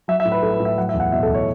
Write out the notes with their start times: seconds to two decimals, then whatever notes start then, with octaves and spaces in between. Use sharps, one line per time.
0.08 F#3 E5
0.20 E5
0.25 A2
0.32 B4
0.42 A2 A4
0.54 B4
0.59 A2
0.65 E5
0.78 F#3 F#5
0.89 E5
0.94 E2
1.00 F#5
1.12 B2 E5
1.23 A4
1.29 E2
1.34 C#5